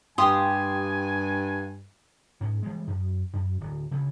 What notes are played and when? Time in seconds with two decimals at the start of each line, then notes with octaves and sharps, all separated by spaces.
0.18 G2 G4 F5 G#5 C6 D#6
2.41 G#2 C#4
2.63 E3 G3 G#3
2.87 F#2
3.33 F#2
3.60 D1
3.91 D2 C#3